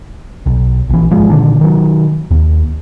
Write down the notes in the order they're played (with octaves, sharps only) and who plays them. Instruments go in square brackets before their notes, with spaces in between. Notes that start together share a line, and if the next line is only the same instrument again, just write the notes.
[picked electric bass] B1
A#1 E3
G#1 F3 G#3
A#2 D3 D#3 D4
D#3 F#3
D#2